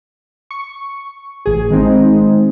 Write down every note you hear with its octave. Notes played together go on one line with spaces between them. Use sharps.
C#6
A1 G#4
D#3 G#3 C4 D#4